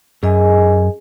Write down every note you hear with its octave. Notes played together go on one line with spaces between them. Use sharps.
F#2 G#4 D#5 G#5